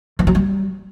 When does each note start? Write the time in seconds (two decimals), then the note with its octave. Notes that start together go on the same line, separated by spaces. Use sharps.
0.19 E3
0.27 F#3
0.35 G3